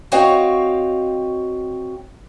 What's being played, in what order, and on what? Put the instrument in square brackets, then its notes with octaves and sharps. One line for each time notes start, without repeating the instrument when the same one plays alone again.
[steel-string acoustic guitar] C4 F#4 C#5 D#5 F5 G5